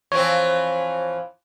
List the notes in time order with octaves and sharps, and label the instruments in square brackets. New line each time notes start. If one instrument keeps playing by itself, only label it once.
[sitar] E3 F3 C4 [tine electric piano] C#5